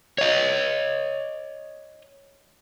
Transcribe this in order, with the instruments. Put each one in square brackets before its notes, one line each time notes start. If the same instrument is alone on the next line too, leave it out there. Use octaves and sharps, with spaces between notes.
[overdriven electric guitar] C#5 D#5